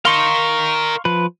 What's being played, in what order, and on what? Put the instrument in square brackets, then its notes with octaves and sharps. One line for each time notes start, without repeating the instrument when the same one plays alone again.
[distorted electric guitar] A#4 D#5 [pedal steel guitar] F5 C6 C#6
[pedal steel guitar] F3 B4